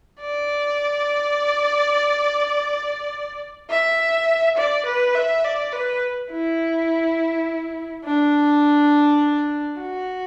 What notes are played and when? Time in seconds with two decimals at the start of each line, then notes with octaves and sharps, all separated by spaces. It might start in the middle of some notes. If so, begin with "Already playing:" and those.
0.21 D5
3.70 E5
4.57 D5
4.85 B4
5.15 E5
5.44 D5
5.73 B4
6.31 E4
8.05 D4
9.80 F#4